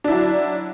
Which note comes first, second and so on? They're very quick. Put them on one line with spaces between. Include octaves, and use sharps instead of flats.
D4 E4 F#3